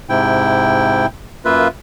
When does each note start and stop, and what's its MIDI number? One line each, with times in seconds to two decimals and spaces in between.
0.09 1.06 44
0.09 1.06 48
0.09 1.06 64
0.09 1.06 79
1.45 1.68 42
1.45 1.68 58
1.45 1.68 65
1.45 1.68 71
1.45 1.68 76